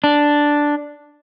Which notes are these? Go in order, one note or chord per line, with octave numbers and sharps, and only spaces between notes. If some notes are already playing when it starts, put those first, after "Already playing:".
D4